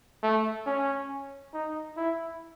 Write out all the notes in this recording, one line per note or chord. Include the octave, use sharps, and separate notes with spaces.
A3
C#4
D#4
E4